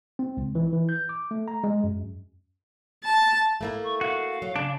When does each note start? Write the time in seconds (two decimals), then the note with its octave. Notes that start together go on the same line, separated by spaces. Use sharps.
0.19 C4
0.37 C#2
0.55 E3
0.73 E3
0.89 G6
1.09 D6
1.31 A3
1.48 A#5
1.64 G#3
1.84 F#2
3.05 A5
3.61 A3 A#3 E4
3.84 C#6
4.01 F#4 F5
4.42 F#3
4.56 C#3 D4